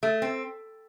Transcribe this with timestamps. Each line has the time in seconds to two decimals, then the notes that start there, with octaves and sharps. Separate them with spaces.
0.03 A3
0.22 C4